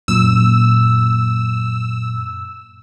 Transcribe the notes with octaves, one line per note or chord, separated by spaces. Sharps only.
F#2 A#2 E6